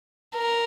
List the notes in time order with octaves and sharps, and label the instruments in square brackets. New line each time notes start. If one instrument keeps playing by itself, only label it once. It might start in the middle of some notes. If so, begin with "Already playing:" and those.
[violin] A#4